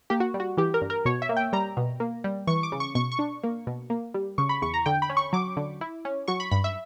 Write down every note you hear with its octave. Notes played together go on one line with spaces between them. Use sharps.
A#3 G4
F#4
G3
F#4
E3 G4
A#4
G2
A#4
B2 C#5
E5
A#3
G5
G3 A#5
B2
A#3
G3
E3 C#6
D6
C#3
C#6
B2 C#6
C#6
D4
A#3
B2
A#3
G3
C#3 C#6
B5
E2 C#6
A#5
D3 G5
B5
C#4
C#6
F#3 D6
D3
E4
C#4
F#3 C#6
B5
G2 B5
E5